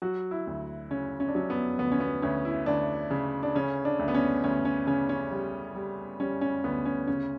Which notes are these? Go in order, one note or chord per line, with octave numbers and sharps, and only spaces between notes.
F#3 F#4
E4
D2
C#3 C#4
C#4
D4
F#3 C#4
B3
D2 B3
C#4
B3
D2 C#4
E4
D2 D4
C#3
D4
C#3 C#4
D4
D2
B3
C#4
D2 C#4
C#4
C#3 C#4
C#4
G3
G3
G3 C#4
C#4
D2 B3
C#4
C#3 C#4